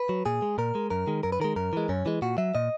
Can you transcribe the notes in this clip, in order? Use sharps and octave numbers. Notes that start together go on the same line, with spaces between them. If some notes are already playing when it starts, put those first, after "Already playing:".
Already playing: B4
F#3
A#2 G#4
G#3
A#2 A#4
G#3
F#2 A#4
D#3 G#3
F#2 A#4
B4
D#3 G#3 A#4
F#2 A#4
E3 G#3
F#2 C#4
E3 G#3
A#2 F#4
F#3 E5
A#2 D#5